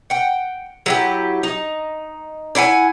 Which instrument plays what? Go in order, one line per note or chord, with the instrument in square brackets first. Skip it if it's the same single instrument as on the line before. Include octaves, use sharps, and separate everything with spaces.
[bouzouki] F#5 G5
F#3 E4 G4
D#4
D4 E4 F#5 G#5